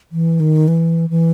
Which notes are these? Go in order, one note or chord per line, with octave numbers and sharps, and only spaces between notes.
E3
D#3
E3
E3